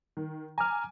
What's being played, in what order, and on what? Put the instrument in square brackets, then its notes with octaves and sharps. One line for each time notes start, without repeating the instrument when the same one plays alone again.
[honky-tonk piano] D#3
[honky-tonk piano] G#5 D6 [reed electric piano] A#5 F6